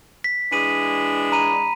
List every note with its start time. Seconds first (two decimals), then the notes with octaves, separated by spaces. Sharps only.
0.24 B6
0.52 E3 G#3 D4 B6 D#7
1.32 A#5 B5 D#7